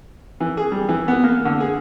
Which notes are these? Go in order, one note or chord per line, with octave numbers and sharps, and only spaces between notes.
E3
G#4
G3
E3
B3
A#3
D3
G#4